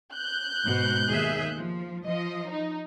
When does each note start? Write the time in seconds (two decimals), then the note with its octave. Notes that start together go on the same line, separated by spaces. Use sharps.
0.15 F#6 G6
0.63 G#2 B2
1.07 D#2 G#4 E5
1.55 F3
2.05 F3 D#5
2.50 D#4